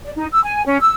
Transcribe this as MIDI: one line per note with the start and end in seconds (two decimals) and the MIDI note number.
0.04 0.12 74
0.16 0.25 63
0.31 0.43 88
0.43 0.63 80
0.66 0.80 61
0.81 0.95 88